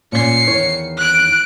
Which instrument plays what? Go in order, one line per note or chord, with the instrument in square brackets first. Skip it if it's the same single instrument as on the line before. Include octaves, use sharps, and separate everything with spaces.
[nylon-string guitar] A#2 C#4 [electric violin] C7 C#7
[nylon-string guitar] E2 D#3 C#5
[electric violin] F#6 D7